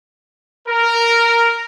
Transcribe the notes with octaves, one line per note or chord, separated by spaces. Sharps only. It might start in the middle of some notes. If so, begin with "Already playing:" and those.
A#4